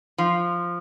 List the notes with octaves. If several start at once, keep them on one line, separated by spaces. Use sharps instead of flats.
F3